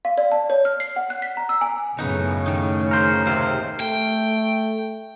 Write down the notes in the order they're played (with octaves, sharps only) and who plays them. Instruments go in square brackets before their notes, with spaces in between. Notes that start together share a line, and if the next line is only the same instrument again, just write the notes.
[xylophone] F5
D5
A5
C#5
F6
C7
F#5
F#6
B6
A#5
E6
G#5
[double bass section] F#2 A2 [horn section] C#3 [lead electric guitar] B3 D#4
[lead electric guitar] D#3 D#4
[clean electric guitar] A#4 C5
[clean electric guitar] D#2 C3 F5 [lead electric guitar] C5
[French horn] A3 [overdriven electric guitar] G5